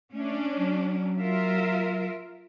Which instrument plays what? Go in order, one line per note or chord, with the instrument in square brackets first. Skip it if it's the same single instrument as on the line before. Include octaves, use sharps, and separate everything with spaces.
[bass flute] A3 [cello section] C#4 D4
[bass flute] F#3
[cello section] F4 A#4 E5